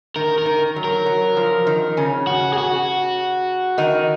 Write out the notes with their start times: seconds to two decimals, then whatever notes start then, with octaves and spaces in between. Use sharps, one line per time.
0.16 D#3 A#4
0.38 A#4
0.46 D#3
0.76 F#3
0.84 A#4
1.06 F#3
1.37 F3
1.67 D#3
1.97 C#3 C#4
2.27 F#4
2.53 G#4
2.58 F#4
3.78 D#3 D#4